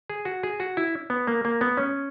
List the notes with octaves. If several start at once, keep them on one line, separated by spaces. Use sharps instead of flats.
G#4
F#4
G#4
F#4
E4
B3
A#3
A#3
B3
C#4